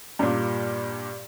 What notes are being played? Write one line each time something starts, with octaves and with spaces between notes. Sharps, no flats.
G2 A#2